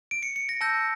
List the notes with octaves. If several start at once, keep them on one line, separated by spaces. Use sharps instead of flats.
D7
C#7
C#7
A#6
A5 E6 G6 A#6